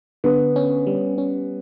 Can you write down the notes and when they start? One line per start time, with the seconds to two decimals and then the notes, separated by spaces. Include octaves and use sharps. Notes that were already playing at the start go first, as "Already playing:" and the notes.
0.24 D3 B3
0.56 C#4
0.87 G3
1.18 C#4